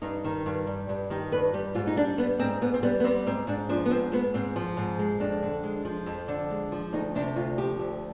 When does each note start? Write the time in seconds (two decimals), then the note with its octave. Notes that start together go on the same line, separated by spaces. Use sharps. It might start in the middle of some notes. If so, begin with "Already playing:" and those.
0.02 G2 D#4
0.24 D#3
0.46 G2
0.67 G3
0.89 G2
1.10 D#3 G4
1.32 G2 B4
1.54 G3 G4
1.75 G#2 F4
1.87 D#4
1.96 G3 D4
2.18 G3 B3
2.39 G#2 C4
2.61 G#2 B3
2.74 C4
2.83 G3 B3
3.00 B3
3.04 G3 C4
3.27 G#2 C4
3.47 G#2 D4
3.69 F3 D4
3.85 B3
3.91 G#2 C4
4.12 G#3 B3
4.34 G#2 C4
4.56 F3
4.77 G#2
4.99 G#3
5.20 F2 D4
5.42 D3
5.63 G#3
5.85 F3
6.06 F2
6.28 D3
6.50 G#3
6.72 F3
6.93 D2 D#4
7.15 C3 D4
7.36 D2 F4
7.58 F3 G4
7.80 D2